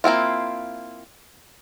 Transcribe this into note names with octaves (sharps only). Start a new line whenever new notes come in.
A#3 C4 E4 F4